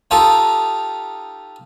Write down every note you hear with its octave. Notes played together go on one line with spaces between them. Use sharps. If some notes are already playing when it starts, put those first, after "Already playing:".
D#4 F4 G4 A4